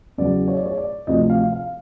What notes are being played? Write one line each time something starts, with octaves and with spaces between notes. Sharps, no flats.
E2 C#3 F#3 D5
C#5
D5
C#5
D5
D2 C3 F3 D#5
F5
F5